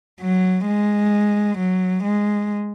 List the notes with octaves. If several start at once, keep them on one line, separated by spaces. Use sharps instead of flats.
F#3
G#3
F#3
G#3